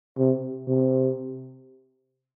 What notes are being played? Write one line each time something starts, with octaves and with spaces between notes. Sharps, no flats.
C3
C3